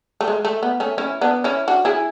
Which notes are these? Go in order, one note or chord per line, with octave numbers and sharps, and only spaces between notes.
A3
G#3
A3
B3
A3 C#4
C#4 E4
B3 D4
C#4 E4
D4 F#4
E4 G#4